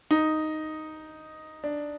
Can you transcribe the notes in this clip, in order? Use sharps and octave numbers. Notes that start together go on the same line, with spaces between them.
D#4
D4